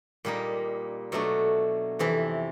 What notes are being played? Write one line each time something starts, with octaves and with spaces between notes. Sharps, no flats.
A#2 G3 A#3 D#4
B2 F#3 A3 D4
F2 C3 E3